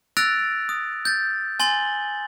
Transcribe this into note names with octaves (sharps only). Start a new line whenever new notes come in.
E6 F#6 A6 A#6 D7 F7
D#6
G6 A6
G#5 C6 A6 F#7 G7